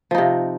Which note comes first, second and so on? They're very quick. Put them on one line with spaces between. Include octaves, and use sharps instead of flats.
F3 D#4 C3